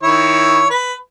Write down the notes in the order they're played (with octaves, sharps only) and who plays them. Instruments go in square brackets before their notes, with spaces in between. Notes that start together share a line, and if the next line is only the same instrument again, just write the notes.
[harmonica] D#3 E4 C#5
B4